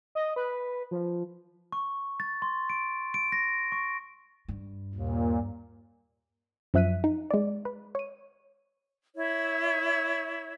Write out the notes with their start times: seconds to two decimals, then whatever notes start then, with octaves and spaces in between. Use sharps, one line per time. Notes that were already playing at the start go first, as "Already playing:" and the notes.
0.15 D#5
0.36 B4
0.91 F3
1.72 C#6
2.20 A6
2.42 C6
2.70 D7
3.14 D7
3.32 A#6
3.72 C#6
4.48 G2
4.95 D#2 A#2
6.74 F#2 F3 E5 F#6 B6 D#7
7.04 D#4
7.31 G#3 D5
7.65 B4
7.95 C#5 D#7
9.16 E4 C#5 E5